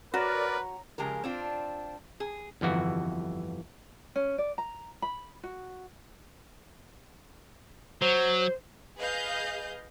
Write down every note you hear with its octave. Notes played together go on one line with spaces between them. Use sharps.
F#4 A#4 B4 C#5 D5 A#5
C#3 F3 G#3 G4 A#4
C4 D4 F4
G#4
G1 F2 E3 F#4
C#4
D5
A#5
B5
F#4
F#3 C5
G#4 B4 D#5 F5 G6